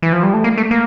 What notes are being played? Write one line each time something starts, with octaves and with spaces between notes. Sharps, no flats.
E3
F3
G3
A3
A#3
A3
A#3